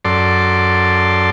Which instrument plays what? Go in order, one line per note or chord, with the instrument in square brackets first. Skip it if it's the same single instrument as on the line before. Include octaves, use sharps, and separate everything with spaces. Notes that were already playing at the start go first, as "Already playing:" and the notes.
[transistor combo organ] F#2 A4 D5 C6